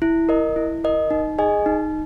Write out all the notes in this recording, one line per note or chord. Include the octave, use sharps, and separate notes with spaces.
E4
A#4 D#5
E4
A#4 D#5
D#4
G#4 D#5 G#5
D#4